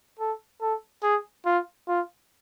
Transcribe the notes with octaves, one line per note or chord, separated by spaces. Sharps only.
A4
A4
G#4
F4
F4